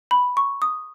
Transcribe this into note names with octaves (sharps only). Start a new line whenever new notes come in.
B5
C#6
D#6